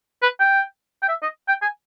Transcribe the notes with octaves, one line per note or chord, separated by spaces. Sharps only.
B4
G5
G5
E5
D#5
G5
G#5